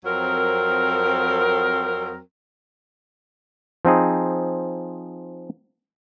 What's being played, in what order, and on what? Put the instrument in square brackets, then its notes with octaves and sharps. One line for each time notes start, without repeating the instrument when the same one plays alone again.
[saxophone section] F2 F#3 C4 A#4
[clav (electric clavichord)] F3 C4 D#4 G#4